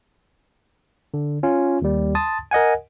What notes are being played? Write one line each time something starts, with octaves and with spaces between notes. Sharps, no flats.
D3
C#4 F4
D#2 G3
A5 C6 D#6 A6
A#4 D#5 F#5 G#5